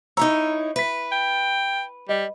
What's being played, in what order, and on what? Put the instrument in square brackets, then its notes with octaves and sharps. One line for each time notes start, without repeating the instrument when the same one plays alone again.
[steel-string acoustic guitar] D#4 E4 C#5 [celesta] A#5 E6
[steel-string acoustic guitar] B4 [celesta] E5 B6
[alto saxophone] G5
[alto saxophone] G3 [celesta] D#5